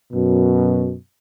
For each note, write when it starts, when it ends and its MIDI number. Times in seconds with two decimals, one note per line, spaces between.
0.13 0.96 42
0.13 0.96 47